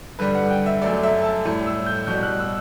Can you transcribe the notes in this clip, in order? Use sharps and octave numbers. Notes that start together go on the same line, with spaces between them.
G2 D3 G3 B4
F#5
G5
E5
F#2 F#3 A3 D5
E5
A5
A2 G3
E6
G6
B2 G3 G6
F#6
E6